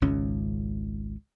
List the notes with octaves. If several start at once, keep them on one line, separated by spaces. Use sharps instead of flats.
G#1 C#2 G#2 C#4